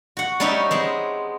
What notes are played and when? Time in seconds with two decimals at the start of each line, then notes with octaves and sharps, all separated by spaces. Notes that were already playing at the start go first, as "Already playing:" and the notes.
0.17 F#4 F#5
0.40 G3 B3 C#4 D#4 C#5 E5
0.71 G#3 B3 C4